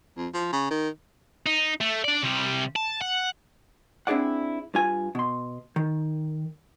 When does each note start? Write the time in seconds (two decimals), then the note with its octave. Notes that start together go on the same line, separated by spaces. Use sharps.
0.17 F2
0.34 F3
0.52 C#3
0.70 D#3
1.46 D#4
1.81 A3
2.04 D4 D5
2.23 C3 G3
2.76 A5
3.01 F#5
4.07 C4 D4 E4 G#4 D5 F#5
4.74 G2 F4 G#5
5.15 B2 C6
5.76 D#3